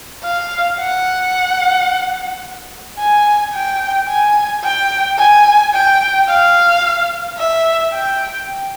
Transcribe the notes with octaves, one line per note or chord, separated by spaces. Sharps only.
F5
F#5
G#5
G5
G#5
G5
G#5
G5
F5
E5
G5